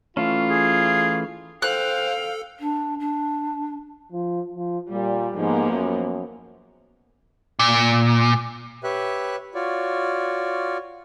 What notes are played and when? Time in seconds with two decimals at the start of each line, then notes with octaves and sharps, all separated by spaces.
0.17 E3 A3 C#4 F4
0.50 G#4
1.62 A4 C5 F5 G5 F#6
2.59 D4
2.99 D4
4.13 F3
4.54 F3
4.92 A#2 G3
5.36 G#2 F3 A#3 B3
5.72 F#2
7.59 A#2
8.83 G4 B4 C#5 E5 F#6
9.54 F4 F#4 C#5 D5